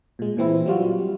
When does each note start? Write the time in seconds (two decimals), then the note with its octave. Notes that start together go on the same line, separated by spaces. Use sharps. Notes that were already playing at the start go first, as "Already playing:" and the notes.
0.19 A#2 G#3
0.37 A#2 E3 C4 E4
0.66 F#3 G3 F4 F#4